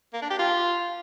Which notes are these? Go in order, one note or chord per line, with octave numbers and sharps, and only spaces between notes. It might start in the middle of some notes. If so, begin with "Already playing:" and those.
A#3
D4
G4
F4